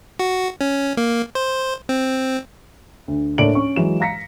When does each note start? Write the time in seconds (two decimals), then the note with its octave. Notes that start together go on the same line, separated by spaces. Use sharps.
0.19 F#4
0.61 C#4
0.97 A#3
1.35 C5
1.89 C4
3.08 D2
3.38 A2 A#3 D4 D5 D7 F#7
3.55 C#4 C#6
3.76 E3 F#3 G#3 E7
4.00 F5 A#5 A#6 B6 C#7